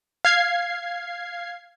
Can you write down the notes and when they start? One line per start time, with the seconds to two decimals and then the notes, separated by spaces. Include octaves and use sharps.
0.25 F5 G#6 C7